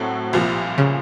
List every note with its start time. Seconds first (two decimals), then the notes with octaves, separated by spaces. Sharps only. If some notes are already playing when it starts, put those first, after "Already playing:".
Already playing: A2 F#3 C4 F#4 A4
0.33 C2 A#2 F3
0.78 C#3